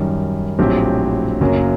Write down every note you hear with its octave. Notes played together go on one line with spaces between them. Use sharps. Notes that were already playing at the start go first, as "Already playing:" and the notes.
Already playing: F#2 D#3 G3
A#1 A2 F#3 C4 G4
F#1 F#2 F#3 A#3